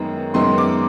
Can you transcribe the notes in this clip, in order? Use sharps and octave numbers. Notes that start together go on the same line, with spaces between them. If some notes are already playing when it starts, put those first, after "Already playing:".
Already playing: F#2 D#3 G#3 B3
F#2 D#3 G#3 B3 C6
D6